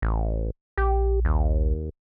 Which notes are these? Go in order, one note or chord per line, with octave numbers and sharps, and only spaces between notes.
A1
A#1 G4
D#2